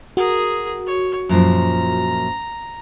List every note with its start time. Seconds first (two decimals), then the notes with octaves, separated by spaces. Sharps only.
0.17 F#4 G#4 A#4
0.86 C#5
1.29 F#2 A#2 F3 A#5